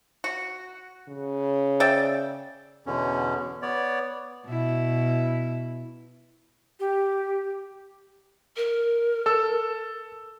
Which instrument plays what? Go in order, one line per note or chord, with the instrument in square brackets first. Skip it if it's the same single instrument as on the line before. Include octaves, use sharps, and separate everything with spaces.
[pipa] F#4
[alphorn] C#3
[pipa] D5 E5 G5
[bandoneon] E2 B2 D3 C#4
B3 C#5 D5
[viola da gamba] B2 E4
[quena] G4
[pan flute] A#4
[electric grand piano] A4 E6